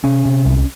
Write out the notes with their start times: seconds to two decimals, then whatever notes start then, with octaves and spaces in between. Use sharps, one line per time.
0.04 C3 C#4
0.25 C3
0.45 C2